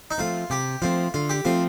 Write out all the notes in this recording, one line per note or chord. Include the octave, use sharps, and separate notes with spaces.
D#4
F3 A3 C4 F4
C3 G4
F3 A3 C4 F4
D3 F4
G4
F3 A3 C4 F4